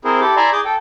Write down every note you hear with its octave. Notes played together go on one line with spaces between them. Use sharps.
C4 E4 G#4 A#4 C5
E4 G4 A4 D6
E4 D5 E5 G#5 A#5 C6
G#4 D6 G6
A4 G5